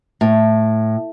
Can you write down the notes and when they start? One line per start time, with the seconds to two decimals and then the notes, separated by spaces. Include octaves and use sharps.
0.21 A2